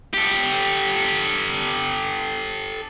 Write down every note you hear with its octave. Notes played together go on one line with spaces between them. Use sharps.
G4 A4